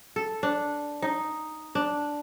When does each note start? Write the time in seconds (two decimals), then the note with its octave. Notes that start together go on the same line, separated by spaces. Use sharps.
0.16 A4
0.43 D4
1.02 D#4
1.75 D4